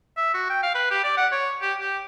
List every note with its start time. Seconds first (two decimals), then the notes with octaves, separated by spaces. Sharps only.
0.17 E5
0.34 F#4
0.50 G5
0.63 F5
0.75 B4
0.91 G4
1.04 D5
1.17 F#5
1.32 C#5
1.62 G4
1.80 G4